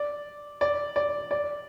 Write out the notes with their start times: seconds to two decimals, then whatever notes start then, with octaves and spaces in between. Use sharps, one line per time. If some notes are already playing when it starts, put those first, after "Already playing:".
Already playing: D5
0.61 D5
0.96 D5
1.31 D5